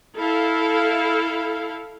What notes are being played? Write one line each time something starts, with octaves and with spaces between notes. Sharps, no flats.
E4 A4 F5